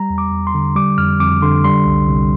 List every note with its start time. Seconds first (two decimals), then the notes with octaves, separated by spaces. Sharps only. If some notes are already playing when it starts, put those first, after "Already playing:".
Already playing: G3 A#5
0.10 E2
0.18 D6
0.32 E2
0.47 C6
0.54 D3
0.76 G3 D6
0.98 F2 F6
1.19 F2 D6
1.42 D3 C6
1.64 G3 C6
1.85 C2
2.08 C2